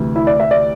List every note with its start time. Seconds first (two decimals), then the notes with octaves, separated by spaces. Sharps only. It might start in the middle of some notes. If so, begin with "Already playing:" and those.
Already playing: D2 C3 E3
0.16 E4
0.27 D5
0.40 E5
0.51 D5